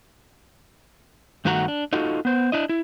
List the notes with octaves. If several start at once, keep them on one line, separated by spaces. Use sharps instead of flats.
G2 D#3 A3 F#4 F#5 A#5
D4
D#4 F4 F#4 A4
B3 C5
D4 E4 D#5
E4